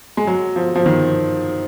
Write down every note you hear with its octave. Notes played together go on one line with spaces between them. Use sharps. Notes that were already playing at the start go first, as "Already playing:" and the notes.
G#3
F#3
F3
F3
D#3